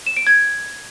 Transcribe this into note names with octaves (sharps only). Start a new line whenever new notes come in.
E7
D7
G#6